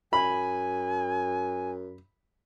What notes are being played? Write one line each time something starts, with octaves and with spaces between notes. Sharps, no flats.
F#2 G#5 B5